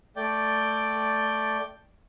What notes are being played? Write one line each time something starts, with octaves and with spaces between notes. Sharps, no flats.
A3 D5 G5